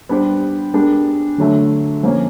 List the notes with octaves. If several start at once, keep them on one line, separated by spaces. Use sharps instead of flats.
G3 B3 D4 G4 C5
G#3 B3 D4 G4 A#4
D3 F#3 A3 D4
F3 A#3 C#4